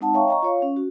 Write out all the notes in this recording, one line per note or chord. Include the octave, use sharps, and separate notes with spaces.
G#3 C4 D#4 F#5 A5
C#5 E5 F5 G5 A#5 C#6
D#5 A#5 C#6
F4 C#5 F5
C#4
F#4